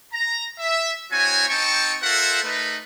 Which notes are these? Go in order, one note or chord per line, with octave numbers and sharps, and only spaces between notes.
A#5
E5
C4 E4 F#4 C#5 G#5
C4 D#4 G5 A5 C#6
F4 A4 A#4 C5 E5 F#5
A3 D#4 A#4 B4